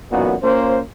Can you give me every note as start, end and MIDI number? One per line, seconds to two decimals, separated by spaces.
0.11 0.35 33
0.11 0.35 42
0.11 0.35 46
0.11 0.35 59
0.11 0.35 63
0.11 0.35 66
0.42 0.79 58
0.42 0.79 61
0.42 0.79 65
0.42 0.79 72